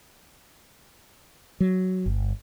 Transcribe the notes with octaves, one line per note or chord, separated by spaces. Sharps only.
F#3
G1